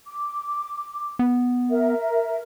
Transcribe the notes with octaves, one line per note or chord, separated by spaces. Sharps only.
D6
B3
A#4 E5